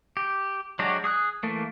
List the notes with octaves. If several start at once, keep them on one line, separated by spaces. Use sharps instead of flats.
G4
F#3 G#3 D4 F#4 G4
G#4 D#6 F#6
E3 A3 A#3